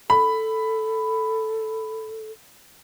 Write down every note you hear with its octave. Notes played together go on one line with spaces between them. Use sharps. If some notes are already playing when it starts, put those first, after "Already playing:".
A4 B5